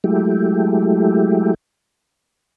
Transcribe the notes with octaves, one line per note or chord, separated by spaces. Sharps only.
F#3 G#3 A3 E4 G4